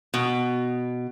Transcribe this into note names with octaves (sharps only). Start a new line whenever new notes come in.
B2